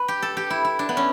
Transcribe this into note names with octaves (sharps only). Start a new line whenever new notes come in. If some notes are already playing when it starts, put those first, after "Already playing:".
Already playing: B4
G4
A4
G4
E4
E4
D4
B3
C#4